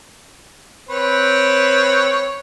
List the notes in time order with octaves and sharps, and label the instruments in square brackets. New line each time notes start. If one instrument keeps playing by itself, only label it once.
[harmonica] C4 B4 C#5